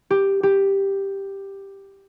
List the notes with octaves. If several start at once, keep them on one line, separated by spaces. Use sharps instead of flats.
G4
G4